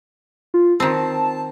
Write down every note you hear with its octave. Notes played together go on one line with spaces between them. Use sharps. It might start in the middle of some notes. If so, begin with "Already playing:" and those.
F4
D#3 C4 A5